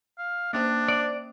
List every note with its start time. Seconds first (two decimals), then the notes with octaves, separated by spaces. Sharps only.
0.18 F5
0.53 A#3 C#4 D4 C5
0.88 D5